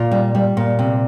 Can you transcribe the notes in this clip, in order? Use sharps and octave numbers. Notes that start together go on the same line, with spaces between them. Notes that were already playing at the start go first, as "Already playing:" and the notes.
Already playing: A#2 F4
G3
G3
A#2
C3